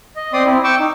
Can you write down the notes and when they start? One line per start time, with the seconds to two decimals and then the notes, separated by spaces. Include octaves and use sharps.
0.16 D#5
0.33 C4 D5 C6 D#6
0.46 C4 E4
0.64 G5 C#6 D6 E6
0.79 D#4